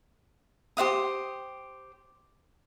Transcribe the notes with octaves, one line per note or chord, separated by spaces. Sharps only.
G4 C5 F5 D#6